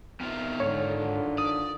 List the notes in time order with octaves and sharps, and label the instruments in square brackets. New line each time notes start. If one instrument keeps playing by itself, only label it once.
[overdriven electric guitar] D#3 F4 [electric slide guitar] B3 C4 E5
[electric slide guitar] G#2 [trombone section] D3 [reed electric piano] C#5
[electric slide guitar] D5 [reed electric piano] D#6